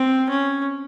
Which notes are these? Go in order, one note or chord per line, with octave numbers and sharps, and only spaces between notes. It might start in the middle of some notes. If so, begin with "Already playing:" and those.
Already playing: C4
C#4